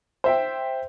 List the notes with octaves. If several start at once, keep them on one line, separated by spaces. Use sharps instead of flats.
C5 E5 G5